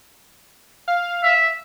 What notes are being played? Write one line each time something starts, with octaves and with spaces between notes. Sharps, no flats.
F5
E5